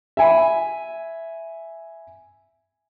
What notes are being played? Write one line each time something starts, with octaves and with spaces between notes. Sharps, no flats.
E5 G#5 B5